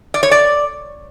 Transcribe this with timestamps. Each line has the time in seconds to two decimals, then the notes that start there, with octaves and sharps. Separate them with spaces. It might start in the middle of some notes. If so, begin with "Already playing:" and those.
0.14 D5
0.23 C#5
0.31 D5